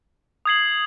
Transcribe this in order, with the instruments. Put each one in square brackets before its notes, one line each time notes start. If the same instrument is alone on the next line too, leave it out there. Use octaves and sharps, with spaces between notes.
[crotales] D#6 G#6 C7 F#7